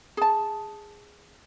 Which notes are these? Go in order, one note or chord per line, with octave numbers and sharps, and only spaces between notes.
G#4 A5